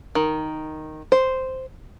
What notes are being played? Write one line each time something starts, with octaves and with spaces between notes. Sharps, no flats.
D#3
C5